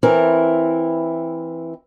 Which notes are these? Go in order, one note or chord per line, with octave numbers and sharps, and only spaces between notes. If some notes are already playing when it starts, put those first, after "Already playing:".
E3 C4 E4 A#4